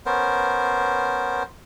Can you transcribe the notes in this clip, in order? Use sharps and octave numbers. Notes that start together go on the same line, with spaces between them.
B3 C#4 A#4 C5